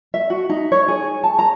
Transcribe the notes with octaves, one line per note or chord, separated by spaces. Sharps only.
E5
F#4
D#4
C#5
G#4
A5
A#5